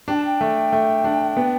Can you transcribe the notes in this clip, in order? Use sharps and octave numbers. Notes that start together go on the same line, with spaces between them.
D4 G5
A5
G5
A3
A3
D4
B3